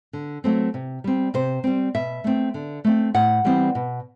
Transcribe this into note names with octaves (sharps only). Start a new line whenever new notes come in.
D3
F#3 A3 C4
C3
G3 C4
C3 C5
G3 C4
B2 E5
A3 C4
D3
A3 C4
A2 F#5
E3 G3 C4
B2